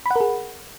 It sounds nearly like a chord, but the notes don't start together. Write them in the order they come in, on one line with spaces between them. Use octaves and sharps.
B5 F#5 A#4 G#4